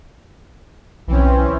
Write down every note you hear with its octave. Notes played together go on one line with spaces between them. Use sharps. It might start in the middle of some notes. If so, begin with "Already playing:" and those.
B1 E3 C4 C#4